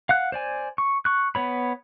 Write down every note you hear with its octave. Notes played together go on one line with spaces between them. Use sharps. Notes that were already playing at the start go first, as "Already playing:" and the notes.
F5 F#5 F#6
C5 D5 G#5
C#6
C#6 F#6
B3 C#5 B5